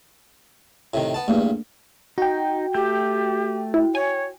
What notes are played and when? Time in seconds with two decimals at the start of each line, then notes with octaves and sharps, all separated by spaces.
0.94 A2 C3 D#3
1.14 B3 A5
1.28 E2 G2 A3 A#3 D4
2.18 D#4 F#4 G5
2.74 A3 G4 G6
3.74 E4
3.95 C#5 G#5